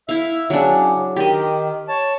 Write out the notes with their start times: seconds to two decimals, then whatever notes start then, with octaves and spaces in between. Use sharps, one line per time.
0.09 E4 E5 F5
0.50 C#3 F#3 D4
1.16 D#3 G4 D#5
1.88 C#5 A5